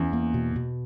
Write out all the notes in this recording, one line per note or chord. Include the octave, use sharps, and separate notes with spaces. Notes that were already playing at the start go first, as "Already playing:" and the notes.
Already playing: E2 C#4
A#3
B2
B2